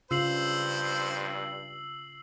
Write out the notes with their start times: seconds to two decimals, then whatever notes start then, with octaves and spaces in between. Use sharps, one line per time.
0.11 G2 C#3 F4 C5 E6 C7 F#7